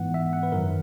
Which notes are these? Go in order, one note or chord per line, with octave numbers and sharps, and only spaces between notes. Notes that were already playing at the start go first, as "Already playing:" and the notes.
Already playing: G#2 E3 B3 F#5
E5
F#5
B4
F#2 D#3 F#3 A#4